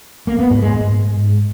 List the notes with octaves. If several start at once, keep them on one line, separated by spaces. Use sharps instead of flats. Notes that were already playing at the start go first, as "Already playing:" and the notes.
A#3
B3
G#2
G#3
G#2